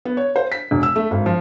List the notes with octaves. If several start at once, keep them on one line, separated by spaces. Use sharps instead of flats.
B3
C#5
C5
B6
E1
E6
A3
G#1
F3